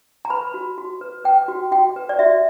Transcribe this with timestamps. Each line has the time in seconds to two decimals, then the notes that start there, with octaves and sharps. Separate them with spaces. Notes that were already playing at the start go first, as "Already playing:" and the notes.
0.25 A#5
0.30 B4 B5
0.54 F#4
0.78 F#4
1.01 B4
1.24 B4 G5
1.48 F#4
1.72 F#4 G5
1.96 B4
2.09 D5
2.19 F#4 E5